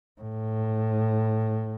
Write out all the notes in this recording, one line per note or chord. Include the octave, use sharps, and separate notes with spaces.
A2